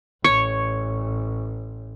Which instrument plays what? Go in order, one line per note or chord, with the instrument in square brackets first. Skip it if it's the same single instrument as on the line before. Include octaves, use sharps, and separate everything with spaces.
[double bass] A1 [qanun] C#5 [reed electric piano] C#6